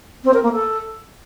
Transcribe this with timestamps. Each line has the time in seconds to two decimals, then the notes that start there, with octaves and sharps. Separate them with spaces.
0.24 C4
0.34 A#4
0.43 A#3
0.53 A4